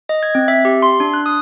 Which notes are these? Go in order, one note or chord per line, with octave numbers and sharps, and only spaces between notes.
D#5
G#6
C4
E5
G4
C6
D4
F#6
D#6